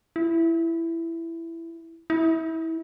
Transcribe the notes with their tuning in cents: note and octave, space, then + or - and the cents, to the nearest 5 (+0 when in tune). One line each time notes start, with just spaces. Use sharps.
E4 +10
E4 -25